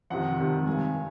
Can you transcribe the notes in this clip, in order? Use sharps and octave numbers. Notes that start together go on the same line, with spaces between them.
F2 C3 D#3 F#5
F2 C3 D#3
G2 D#3 G#5